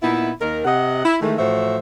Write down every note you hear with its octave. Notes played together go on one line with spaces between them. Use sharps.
A#2 B3 D#4 E4
D#2 D#3 A#4
C3 D#5 F#5
E4
D#3 E3 G#3 A3
A2 E3 F3 F#4 C5 E5